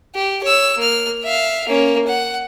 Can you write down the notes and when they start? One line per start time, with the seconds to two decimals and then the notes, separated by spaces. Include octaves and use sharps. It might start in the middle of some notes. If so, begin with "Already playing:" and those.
0.15 G4
0.43 C#5 E6
0.78 A#3 F6
1.23 E5 F5
1.68 A#3 C#4
2.07 F#5